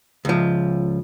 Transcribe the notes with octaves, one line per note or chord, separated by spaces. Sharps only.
C#2 F3